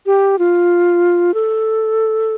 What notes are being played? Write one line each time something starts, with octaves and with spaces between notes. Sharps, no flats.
G4
F4
A4